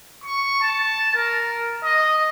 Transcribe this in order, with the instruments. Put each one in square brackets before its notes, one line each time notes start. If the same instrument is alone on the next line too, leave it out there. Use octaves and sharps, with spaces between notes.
[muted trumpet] C#6
A5
A#4
D#5